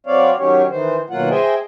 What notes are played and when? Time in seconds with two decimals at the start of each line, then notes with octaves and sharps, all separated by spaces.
0.06 F#3 C4 C#5 D5 F5
0.38 D#3 F#3 C#4 G4 C#5
0.70 D#3 E3 C5
1.10 D#2 B2 F#3 A#3 F4 F#5
1.30 G#4 C5 D#5 E5 G5 G#5